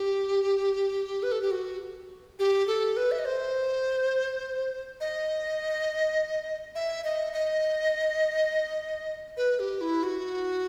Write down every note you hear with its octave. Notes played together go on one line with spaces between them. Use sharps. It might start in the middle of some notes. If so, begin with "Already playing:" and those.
Already playing: G4
B4
A4
G4
F#4
G4
A4
B4
E5
D#5
C5
D#5
E5
D#5
D#5
B4
G4
E4
F#4